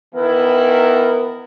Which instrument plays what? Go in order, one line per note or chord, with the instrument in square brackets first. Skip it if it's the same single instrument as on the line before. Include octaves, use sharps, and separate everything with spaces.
[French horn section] D#3 E3 E4 [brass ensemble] B3 A#4